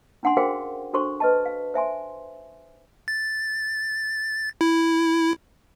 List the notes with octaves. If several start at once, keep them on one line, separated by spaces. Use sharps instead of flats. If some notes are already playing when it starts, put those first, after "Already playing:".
C#4 D4 F#5 G#5 C6
F#4 G#4 A#4 C5 F5 G5
D4 F#4 A4 C5 C6 C#6
B4 D#5 A5
F5
C5 E5 G#5 C6
A6
E4